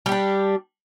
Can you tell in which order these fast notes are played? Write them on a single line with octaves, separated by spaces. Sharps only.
G3 G4 D4